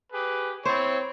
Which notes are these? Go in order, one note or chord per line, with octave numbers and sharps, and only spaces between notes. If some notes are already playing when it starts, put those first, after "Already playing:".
G4 G#4 B4
C4 E4 C5 C#5